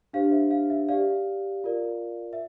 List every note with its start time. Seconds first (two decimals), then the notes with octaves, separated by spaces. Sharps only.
0.13 D4 G4 C5 F5
0.32 E5
0.51 F5
0.70 E5
0.89 G4 D5 F5
1.64 F4 A#4 D5
2.33 E5